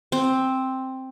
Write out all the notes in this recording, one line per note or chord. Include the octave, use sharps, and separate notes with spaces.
C4